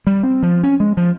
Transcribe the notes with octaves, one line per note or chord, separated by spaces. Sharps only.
G3
C4
F3
C#4
G#3
F3